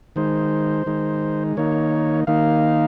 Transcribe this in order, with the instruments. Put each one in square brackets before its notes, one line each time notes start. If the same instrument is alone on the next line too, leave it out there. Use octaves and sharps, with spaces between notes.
[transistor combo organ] D#3 G#3 D#4 C5
D#3 G#3 D#4
D#3 A#3 D#4 C#5
D#3 A#3 D#4 F5